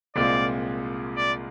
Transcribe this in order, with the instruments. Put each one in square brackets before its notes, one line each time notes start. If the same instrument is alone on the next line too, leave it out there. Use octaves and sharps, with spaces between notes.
[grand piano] C2 A#2 G#3 C4 F4 [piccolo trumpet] D5
[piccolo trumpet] D5